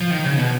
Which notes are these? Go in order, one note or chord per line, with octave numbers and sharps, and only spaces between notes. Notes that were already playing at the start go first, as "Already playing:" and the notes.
F3
D#3
C#3
B2